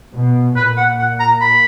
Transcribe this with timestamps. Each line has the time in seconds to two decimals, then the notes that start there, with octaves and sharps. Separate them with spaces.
0.13 B2
0.56 A#2 B4
0.77 F#5
0.99 F#5
1.20 A#5
1.41 B5